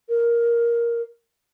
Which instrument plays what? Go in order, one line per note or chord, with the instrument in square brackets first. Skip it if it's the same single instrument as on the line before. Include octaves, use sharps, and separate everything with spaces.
[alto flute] A#4